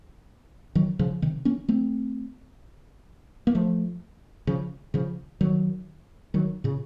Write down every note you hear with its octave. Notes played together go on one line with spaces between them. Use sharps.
D#3 F#3
C#3 F3
C3 D#3
A#3 C#4
A3 C4
A#3
F3 A3
C#3 F3
C#3 F3
D#3 F#3
D#3 F#3
A#2 C#3